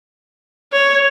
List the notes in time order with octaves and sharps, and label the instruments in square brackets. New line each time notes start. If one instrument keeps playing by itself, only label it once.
[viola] C#5